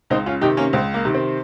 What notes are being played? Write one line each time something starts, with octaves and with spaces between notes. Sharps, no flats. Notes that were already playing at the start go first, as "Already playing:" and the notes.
C#2 C4 D#4
C#4 F4
C3 D#3 D#4 G4
A#3 C#4
C#2 C4
A#3
C3 D#3
C4